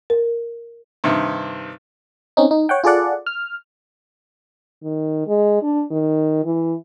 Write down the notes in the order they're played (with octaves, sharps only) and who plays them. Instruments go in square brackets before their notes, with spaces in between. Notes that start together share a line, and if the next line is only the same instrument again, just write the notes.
[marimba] A#4
[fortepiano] G2 C3 D#3
[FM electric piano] C4 C#4 D#4
D#4
C#5 F#5 G5
F4 G#4 A4 D5 F#5
F6
[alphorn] D#3
G#3
D4
D#3
E3